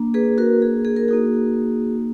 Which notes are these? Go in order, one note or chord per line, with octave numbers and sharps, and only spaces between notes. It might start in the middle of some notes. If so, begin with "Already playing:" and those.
Already playing: A#3 D4
G#4 B4
F#4 A#4
G#4
G#4
A#4
A#3 D#4 F#4 G#4